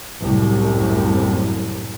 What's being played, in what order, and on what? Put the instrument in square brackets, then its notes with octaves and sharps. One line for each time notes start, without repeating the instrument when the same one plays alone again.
[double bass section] C2 F#2 A2